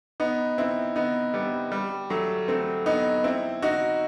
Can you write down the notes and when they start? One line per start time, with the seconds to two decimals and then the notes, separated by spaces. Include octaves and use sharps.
0.20 B3 D#4
0.58 C4 E4
0.96 B3 D#4
1.34 G3 B3
1.72 G3
2.10 F#3 A3
2.48 A3 C4
2.86 B3 D#4
3.24 C4 E4
3.62 D#4 F#4